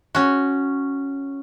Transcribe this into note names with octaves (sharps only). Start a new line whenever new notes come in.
C#4 F#4